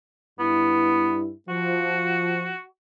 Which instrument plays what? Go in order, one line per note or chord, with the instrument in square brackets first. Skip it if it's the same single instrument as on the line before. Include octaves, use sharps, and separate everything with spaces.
[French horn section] G2 E4 [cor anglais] B3
[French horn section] F3 [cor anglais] F#4